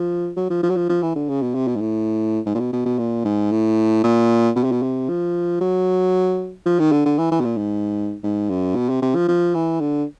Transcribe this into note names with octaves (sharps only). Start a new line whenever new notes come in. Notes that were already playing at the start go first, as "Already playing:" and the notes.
Already playing: F3
F#3
F3
F3
F#3
F3
F3
E3
D3
C#3
B2
C3
B2
G#2
A2
G#2
A#2
B2
B2
B2
A#2
G#2
A2
A#2
B2
C3
B2
C3
F3
F#3
F3
D#3
D3
D3
E3
E3
B2
A#2
G#2
G#2
F#2
B2
C3
C3
F3
F3
E3
D3